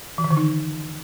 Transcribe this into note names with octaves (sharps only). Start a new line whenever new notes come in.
E3
D#3
D3
D#4